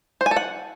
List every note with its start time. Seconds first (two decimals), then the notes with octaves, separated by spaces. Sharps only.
0.21 C5
0.26 G#5
0.31 A4
0.36 F#5